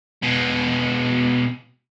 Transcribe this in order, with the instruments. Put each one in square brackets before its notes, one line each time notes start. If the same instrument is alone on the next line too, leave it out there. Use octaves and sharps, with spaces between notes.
[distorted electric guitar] B2 G#3